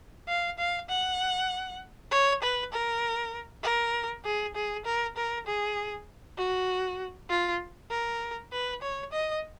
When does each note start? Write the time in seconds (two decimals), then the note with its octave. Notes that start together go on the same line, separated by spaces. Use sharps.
0.28 F5
0.58 F5
0.89 F#5
2.11 C#5
2.42 B4
2.73 A#4
3.63 A#4
4.25 G#4
4.55 G#4
4.85 A#4
5.17 A#4
5.47 G#4
6.38 F#4
7.30 F4
7.90 A#4
8.52 B4
8.82 C#5
9.12 D#5